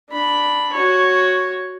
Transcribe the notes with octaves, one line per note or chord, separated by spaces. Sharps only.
D4 B5
F#4 C#5